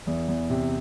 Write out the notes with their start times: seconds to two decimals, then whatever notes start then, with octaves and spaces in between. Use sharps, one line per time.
0.07 E2
0.28 E2
0.50 C3